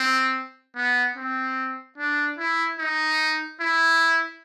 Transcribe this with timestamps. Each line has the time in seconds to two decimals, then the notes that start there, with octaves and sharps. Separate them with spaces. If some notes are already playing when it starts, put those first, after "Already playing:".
Already playing: C4
0.76 B3
1.16 C4
1.98 D4
2.39 E4
2.79 D#4
3.61 E4